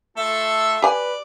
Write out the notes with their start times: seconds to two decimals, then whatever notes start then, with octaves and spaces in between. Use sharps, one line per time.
0.17 A3 F4 A4 E5
0.82 G4 B4 D5 G#5